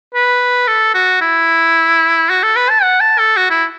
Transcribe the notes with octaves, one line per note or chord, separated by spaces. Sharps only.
B4
A4
F#4
E4
F#4
A4
B4
A5
F#5
A5
A4
F#4
E4